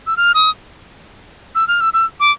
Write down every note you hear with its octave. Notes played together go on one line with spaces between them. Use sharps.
E6
F6
D#6
E6
F6
E6
E6
D6